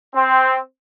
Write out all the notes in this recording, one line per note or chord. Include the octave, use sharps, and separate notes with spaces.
C4